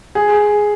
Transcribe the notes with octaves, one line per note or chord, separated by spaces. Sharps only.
G#4